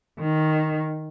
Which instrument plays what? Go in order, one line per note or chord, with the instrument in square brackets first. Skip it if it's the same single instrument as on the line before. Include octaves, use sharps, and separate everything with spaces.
[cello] D#3